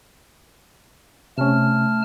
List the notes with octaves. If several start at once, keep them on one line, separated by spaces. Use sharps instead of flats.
C3 A3 C#4 A5 F6